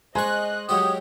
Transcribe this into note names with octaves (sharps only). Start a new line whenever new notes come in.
G#3 C5 D#5 G#5 C6 C#6 F#6
F#3 G#3 F#4 G4 C#5 D#6